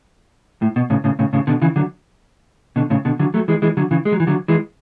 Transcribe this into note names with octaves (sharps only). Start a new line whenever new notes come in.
A2
B2
A2 C#3
A2 C#3
A2 C#3
A2 C#3
B2 D3
C#3 E3
D3 F#3
B2 D3
A2 C#3
B2 D3
D3 F#3
F#3 A3
E3 G#3
E3 G#3
D3 F#3
C#3 E3
G#3
F#3
E3
D3 F#3
E3 G#3